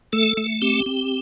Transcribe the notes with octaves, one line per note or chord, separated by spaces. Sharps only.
A3 A4
A3
C4 G4
C4